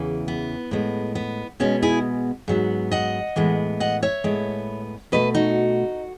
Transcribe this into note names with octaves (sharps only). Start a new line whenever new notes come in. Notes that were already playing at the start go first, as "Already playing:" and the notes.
Already playing: E2 C#3 E3
B3
A2 G#3 B3
B3
B2 G#3 B3 C#4
E4 G#4
G#2 F#3 B3
D#5 F#5
A2 E3 G#3 B3
D#5 F#5
C#5 E5
A2 G#3 B3
B2 A3 B4 D#5
D#4 F#4